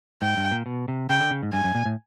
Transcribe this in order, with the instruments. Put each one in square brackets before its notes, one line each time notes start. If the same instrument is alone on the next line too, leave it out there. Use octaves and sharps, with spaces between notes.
[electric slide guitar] G#2 [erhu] G5
[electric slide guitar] G2
A#2
B2
C3
[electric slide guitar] C#3 [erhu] G5
[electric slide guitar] D3
C#3
G#2
[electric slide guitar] G2 [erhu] G#5
[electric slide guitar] F#2
A#2
A2